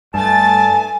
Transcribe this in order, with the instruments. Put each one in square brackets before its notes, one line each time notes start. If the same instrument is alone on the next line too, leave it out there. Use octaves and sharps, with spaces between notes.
[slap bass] G2 [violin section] A3 A6 [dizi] G#5 [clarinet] A5